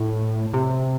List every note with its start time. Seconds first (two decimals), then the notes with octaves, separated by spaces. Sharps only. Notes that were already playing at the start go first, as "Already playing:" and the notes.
Already playing: A2
0.54 C3